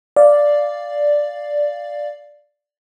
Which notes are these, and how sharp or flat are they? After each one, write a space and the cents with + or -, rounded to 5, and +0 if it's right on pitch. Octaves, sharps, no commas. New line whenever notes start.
D5 +0 F5 +0